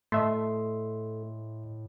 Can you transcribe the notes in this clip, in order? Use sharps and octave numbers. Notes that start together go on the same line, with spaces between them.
A2 A3 D#5 E5 C6